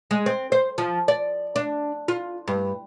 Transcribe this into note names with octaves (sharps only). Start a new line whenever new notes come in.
G#3
C4
C5
F3
D5
D4
F4
G2